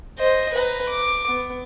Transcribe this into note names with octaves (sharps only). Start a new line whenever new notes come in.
C5 D#5
B4 A#5
D6
B3